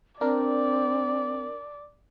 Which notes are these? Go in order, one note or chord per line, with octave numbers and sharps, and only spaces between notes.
C4 D4 A#4 D5